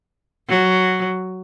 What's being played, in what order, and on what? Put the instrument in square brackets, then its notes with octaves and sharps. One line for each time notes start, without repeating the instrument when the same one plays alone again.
[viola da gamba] F#3